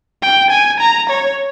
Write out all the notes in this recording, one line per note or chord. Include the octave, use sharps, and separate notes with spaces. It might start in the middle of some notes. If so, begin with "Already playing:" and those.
G5
G#5
A#5
C#5